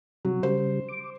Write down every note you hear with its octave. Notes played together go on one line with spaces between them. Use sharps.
C3 F#3
C#3 G3 C5
D6